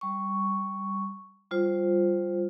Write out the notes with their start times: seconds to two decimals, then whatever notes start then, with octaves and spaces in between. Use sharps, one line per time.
0.01 G3 C#6
1.51 G3 F4 C5